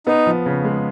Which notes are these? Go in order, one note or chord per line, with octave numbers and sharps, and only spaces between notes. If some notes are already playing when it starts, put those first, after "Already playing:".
B3 D#4
F3
C#3
G#3